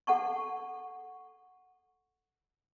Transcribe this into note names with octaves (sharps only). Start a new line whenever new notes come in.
A4 F#5 A5 C#6